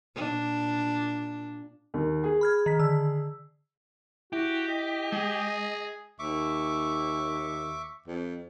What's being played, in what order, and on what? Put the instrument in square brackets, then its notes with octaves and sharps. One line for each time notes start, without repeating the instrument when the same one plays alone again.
[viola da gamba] A#2 D4
[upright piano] D#2
G#4
[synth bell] B5 F6 G#6
D#3 B6
D3 E6
[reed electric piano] E4 [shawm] F#4 [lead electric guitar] G4
[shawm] D#5
[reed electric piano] G#3 [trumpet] G#4
[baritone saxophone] D#2 [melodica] E5 C#6 D6
[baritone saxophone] F2